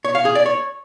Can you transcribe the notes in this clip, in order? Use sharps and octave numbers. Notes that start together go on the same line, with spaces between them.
C#5
F5
G#4
D5
C#5